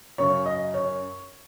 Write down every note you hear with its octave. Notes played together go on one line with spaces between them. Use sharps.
F#2 C#3 F#3 C#5
D#5
C#5